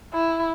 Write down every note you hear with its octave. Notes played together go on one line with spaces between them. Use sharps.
E4